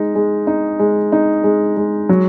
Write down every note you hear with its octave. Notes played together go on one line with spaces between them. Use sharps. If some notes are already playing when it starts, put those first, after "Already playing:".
Already playing: G#3 D#4
G#3
D#4
G#3
D#4
G#3
G#3
F#3